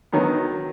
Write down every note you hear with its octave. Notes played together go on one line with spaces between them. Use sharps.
D#3 F#3 B3